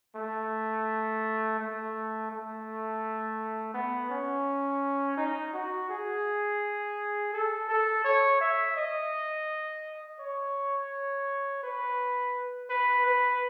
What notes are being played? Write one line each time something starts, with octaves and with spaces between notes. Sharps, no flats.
A3
A3
A3
B3
C#4
D#4
F#4
G#4
A4
A4
C#5
E5
D#5
C#5
B4
B4
B4